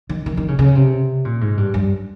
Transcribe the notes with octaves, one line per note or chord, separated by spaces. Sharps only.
D#3
D#3
D#3
C#3
C#3
C3
A#2
G#2
G2
G2